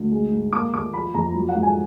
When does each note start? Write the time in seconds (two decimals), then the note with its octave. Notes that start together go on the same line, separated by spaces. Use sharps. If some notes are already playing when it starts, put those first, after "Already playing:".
Already playing: D2
0.11 G#3
0.32 G#2
0.53 A#3 D6
0.73 D#2 D6
0.93 F3 B5
1.14 F2 A#5
1.35 F#3
1.49 F#5
1.55 G#2
1.62 G#5